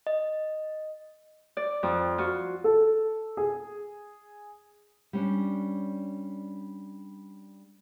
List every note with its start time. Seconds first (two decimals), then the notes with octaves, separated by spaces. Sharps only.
0.07 D#5
1.57 D5
1.83 F2
2.18 F4 F#4
2.64 A4
3.37 G#4
5.13 G3 C#4 D4